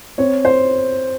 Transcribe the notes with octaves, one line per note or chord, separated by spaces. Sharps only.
C4 C#5
C5